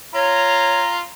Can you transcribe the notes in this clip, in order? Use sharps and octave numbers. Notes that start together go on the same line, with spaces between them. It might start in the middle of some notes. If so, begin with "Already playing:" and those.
F4 C#5 A#5